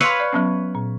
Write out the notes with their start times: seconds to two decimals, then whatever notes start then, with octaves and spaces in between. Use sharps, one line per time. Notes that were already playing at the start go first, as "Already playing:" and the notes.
0.01 B4 C#5 F5 C6 E6
0.20 D5
0.33 F#3 B3 C#4
0.75 A#2